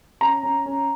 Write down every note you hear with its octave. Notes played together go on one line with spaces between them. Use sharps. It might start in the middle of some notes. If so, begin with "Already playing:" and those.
C#4 A#5
C#4
C#4